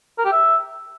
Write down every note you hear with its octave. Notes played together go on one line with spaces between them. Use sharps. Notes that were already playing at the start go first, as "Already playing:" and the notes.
A#4
G4
E5